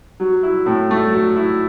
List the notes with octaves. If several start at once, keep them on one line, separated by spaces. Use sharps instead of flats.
F#3
E4
A2
A3
F#3
E4